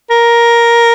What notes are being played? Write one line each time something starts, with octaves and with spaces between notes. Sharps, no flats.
A#4